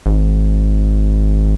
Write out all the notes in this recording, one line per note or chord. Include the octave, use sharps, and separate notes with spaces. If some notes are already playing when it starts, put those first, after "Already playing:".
G#1